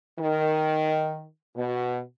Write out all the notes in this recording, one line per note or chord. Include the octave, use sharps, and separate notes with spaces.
D#3
B2